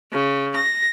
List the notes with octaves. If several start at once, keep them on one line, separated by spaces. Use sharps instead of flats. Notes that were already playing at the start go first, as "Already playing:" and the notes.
C#3
A#6